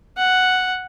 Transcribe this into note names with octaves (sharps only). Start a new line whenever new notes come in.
F#5